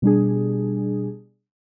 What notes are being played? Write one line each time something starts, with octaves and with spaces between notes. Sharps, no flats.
B2 G3 D4 G#4